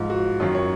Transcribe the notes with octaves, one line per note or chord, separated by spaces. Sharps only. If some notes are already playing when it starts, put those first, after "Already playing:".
Already playing: G#2 F3
F#4
F#2 D#3 F#3 F4
C#5